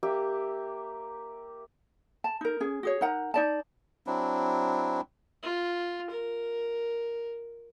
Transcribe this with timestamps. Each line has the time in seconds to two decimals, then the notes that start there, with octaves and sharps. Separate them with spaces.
0.03 A#3 G4 E5
2.24 A5
2.41 D#4 A#4
2.60 C#4 G#4
2.83 F#4 G#4 C#5
3.01 D#4 A#4 F#5 A#5
3.34 D#4 D5 A5
4.07 F#3 C4 D4 E4
5.43 F4
6.10 A#4